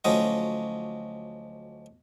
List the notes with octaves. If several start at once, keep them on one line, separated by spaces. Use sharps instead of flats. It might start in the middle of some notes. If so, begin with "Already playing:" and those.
D2 F3 F#3 C#4 D#4 D#5